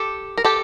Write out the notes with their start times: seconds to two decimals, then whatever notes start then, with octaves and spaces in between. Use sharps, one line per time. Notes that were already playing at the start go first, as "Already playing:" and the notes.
Already playing: G4 A4
0.38 A#4
0.45 G4 A4